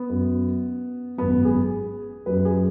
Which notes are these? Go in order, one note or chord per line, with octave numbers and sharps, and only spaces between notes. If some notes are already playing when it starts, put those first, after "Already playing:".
Already playing: B3
F#2 F#3
G#1 F#2 F#3 B3
G#4
F#2 F#3 B4
G#4